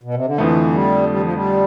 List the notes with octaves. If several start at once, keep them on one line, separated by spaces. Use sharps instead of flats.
B2
C3
D3
F2 D3 E3 F3 A3
G3
G3
E3
F3
G3